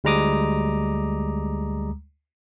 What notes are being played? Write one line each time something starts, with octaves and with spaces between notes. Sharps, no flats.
D2 G3 G#3 A#5 D6 D#6